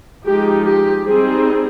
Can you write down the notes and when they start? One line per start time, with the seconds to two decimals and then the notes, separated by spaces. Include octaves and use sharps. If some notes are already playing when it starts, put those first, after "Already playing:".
0.25 F3 G#3 D#4 G4
0.66 G4
1.06 G3 C4 D#4 G#4